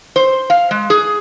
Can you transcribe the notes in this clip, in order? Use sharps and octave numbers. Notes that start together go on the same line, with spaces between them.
C5
F5
G#3
G#4